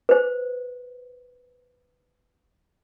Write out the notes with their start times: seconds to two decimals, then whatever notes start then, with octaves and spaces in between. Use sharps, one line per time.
0.09 B4 C5